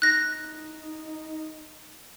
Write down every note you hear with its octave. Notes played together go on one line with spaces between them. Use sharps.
D#4 F#6 A#6